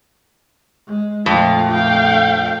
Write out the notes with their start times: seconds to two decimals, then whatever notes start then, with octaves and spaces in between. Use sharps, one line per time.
0.87 G#3
1.26 F2 A#2 A3 F4 F5
1.71 F5 G5